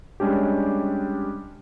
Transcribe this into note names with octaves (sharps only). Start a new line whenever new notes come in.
G3 G#3 C#4 D4 G4